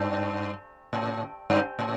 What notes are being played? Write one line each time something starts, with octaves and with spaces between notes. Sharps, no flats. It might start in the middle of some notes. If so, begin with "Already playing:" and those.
Already playing: G2
A2
G2
A2